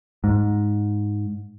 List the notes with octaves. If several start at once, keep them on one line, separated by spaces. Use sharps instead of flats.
G#2